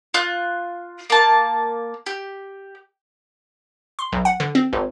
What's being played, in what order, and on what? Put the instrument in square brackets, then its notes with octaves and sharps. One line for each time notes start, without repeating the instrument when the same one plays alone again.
[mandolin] F4 F#6
A#3 A5
G4
[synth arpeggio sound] C6
B1
F#5
D3
C4
G#1